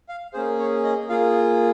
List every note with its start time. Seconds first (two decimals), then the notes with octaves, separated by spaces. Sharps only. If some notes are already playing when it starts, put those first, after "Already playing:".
0.09 F5
0.33 A#3 C#4 G#4 C5
0.59 C#5
0.84 D#5
1.09 A#3 F4 G#4 F5